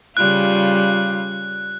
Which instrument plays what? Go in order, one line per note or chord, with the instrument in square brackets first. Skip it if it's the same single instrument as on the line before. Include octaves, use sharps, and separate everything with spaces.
[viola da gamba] C#3 G3 F4 [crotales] F#6